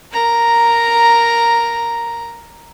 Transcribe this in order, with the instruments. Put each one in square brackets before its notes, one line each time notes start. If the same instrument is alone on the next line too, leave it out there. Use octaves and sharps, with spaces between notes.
[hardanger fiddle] A#4 A#5